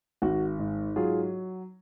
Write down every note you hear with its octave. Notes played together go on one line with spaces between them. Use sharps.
G#1 F#4
G#2
F#3 F4 G#4